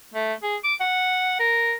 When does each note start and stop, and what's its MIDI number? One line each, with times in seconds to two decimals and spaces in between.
0.14 0.34 57
0.43 0.56 68
0.64 0.75 86
0.81 1.36 78
1.40 1.74 70